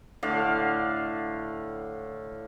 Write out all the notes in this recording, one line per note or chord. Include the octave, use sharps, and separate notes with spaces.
A2 D3 D5 F5